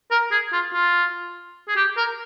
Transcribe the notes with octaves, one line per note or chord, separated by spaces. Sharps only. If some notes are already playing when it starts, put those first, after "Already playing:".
A#4
G#4
F4
F4
G#4
G4
A#4